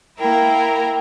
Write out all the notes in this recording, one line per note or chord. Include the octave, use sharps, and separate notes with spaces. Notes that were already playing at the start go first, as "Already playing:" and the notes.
A#3 E4 A#4 G5